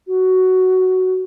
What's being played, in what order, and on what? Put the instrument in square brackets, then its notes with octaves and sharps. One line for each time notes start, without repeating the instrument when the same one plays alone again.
[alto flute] F#4